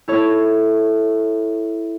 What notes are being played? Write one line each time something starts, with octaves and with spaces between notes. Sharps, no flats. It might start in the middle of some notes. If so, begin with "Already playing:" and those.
E4 A4 C#5